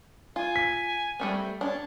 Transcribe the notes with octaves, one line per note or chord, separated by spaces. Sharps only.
F4 G#5
B6
G3 A3 C4
C#4 D4